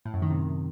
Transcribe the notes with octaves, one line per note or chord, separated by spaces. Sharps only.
A2
F#2
D#3
C3